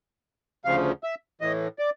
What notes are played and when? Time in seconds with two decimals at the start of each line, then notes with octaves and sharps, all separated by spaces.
0.65 D2 C#3 F3 F5
1.04 E5
1.41 A2 E3 D#5
1.79 D5